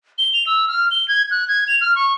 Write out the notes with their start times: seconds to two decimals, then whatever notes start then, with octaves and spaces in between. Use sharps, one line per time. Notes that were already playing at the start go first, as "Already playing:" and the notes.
0.18 G7
0.34 F7
0.47 E6
0.68 F6
0.91 G7
1.08 G#6
1.31 F#6
1.48 G#6
1.68 F7
1.81 F6
1.96 C#6